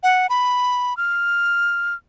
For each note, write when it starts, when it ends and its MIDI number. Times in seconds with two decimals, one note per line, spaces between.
0.03 0.27 78
0.30 0.96 83
0.97 1.94 89